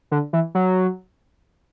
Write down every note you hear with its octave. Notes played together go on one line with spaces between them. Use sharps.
D3
E3
F#3